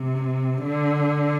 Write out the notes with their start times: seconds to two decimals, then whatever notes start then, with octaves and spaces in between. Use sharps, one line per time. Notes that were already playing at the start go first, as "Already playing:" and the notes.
Already playing: C3
0.63 D3